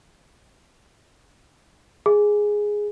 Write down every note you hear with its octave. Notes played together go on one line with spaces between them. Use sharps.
G#4